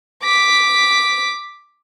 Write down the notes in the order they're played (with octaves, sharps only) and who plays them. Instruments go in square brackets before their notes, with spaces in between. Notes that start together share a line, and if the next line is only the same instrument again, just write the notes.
[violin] D6 B6